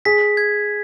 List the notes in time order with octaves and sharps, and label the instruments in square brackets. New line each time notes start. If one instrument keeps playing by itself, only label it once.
[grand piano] G#4 [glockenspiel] B6
[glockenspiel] G#6